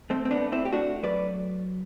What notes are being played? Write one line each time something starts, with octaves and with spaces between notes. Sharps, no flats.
A3 C4
C4
B3 D4
A3
C4 E4
G4
A3 D4 F#4
F#3 B4 D5